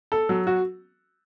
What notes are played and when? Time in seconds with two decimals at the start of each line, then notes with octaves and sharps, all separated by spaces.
0.12 A4
0.29 F#3
0.47 F#4